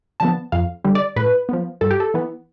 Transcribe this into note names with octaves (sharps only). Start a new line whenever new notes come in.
D3 F3 B3 A5
F2 F5
D3 G3
D5
A2 B4
F3 B3
G2 A4
G4
A4
E3 B3